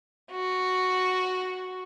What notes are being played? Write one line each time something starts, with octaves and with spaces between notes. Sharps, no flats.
F#4